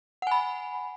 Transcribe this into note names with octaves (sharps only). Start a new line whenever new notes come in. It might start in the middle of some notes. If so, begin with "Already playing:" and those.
F#5 G#5 B5